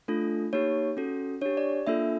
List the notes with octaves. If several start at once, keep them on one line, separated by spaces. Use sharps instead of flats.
A3 D4 F4 A4
A#3 D#4 G4 C#5
C#4 F#4 A4
D4 G4 C#5
D5
A#3 D4 F4 A4 E5